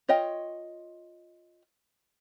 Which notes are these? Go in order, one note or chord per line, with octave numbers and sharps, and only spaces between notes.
F4 C#5 D#5 G5